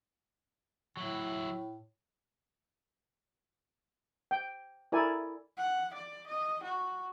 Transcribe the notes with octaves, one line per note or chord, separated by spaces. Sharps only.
A2 F#3 E4
G5
E4 A4 A#4 D5 G#5
F#5
D5
D#5
F#4